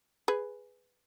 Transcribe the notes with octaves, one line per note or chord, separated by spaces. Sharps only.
G#4 B4